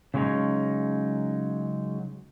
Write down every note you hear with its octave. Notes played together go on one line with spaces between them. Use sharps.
C#3 F#3 G#3 C#4 D#4